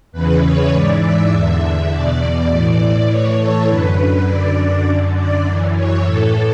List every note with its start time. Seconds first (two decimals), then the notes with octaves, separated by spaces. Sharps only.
0.12 E2 C#3 E3 B4
0.41 C#5
0.71 G#2 E3 D5
1.00 E5
1.30 E2 D3
1.90 E2 B2 D5
2.19 D5
2.48 A2 E3
3.07 A2 E3 C#5
3.38 A4
3.67 F#2 D3 B4
3.96 B4
4.26 F#2 D3 D5
4.85 F#2 D3
5.15 D5
5.44 F#2 E3
5.74 C#5
6.03 A2 E3 A4